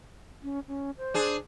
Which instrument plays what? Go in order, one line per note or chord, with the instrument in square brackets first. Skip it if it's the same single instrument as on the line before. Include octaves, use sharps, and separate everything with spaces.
[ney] C#4
C#4
C5
[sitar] D4 G#4